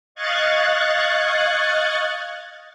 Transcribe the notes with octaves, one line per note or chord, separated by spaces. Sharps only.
D#5 F5 C#6 F#6 G#6 A6